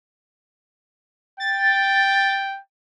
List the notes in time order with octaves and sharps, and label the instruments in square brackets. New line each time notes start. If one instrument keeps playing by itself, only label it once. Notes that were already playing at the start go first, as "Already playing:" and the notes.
[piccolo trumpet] G5 [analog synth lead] A6